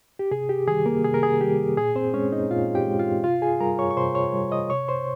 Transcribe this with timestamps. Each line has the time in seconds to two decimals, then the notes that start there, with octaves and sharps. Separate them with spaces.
0.19 G4
0.31 C3 G#4
0.49 G4
0.67 D#3 G3 G#4
0.86 A#3 A#4
1.04 C3 G#4
1.14 A#4
1.23 G#4
1.41 D#3 G3 G4
1.77 A#2 G#4
1.95 C4 C5
2.14 G#3 C#4 C#5
2.32 D#4 D#5
2.51 A#2 F4 F5
2.75 G4 G5
2.87 G#3
2.99 F4 F5
3.24 C3 F4 F5
3.42 G#4 G#5
3.60 G3 A#4 A#5
3.79 C#5 C#6
3.91 C#6
3.97 C3 C5 C6
4.15 C#5 C#6
4.33 G3
4.52 D#5 D#6
4.70 C3 C#5 C#6
4.88 C5 C6